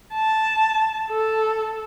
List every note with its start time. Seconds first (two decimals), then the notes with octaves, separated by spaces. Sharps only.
0.13 A5
1.10 A4